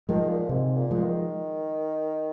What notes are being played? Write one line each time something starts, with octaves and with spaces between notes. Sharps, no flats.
D#3 F3 G#3
A#2
G#2 C3
A#2
F3 G#3
D#3